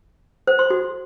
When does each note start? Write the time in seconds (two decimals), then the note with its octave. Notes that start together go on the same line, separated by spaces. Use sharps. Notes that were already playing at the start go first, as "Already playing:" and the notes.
0.47 C5
0.59 C6
0.70 F#4